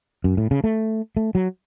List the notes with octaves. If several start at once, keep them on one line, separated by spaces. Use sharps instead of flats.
F#2
A2
C#3
A3
A3
F#3